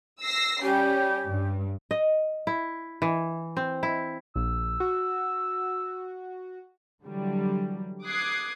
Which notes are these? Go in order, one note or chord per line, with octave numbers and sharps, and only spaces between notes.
E6 A#6 C7
G3 C#4 G4
G2
D#5
E4
E3
C4
E4
A#1 E6
F#4
D3 E3 F#3 G3
D6 D#6 F#6 G#6 C7